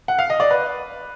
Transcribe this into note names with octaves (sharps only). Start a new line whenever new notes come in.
F#5
F5
D#5
D5
B4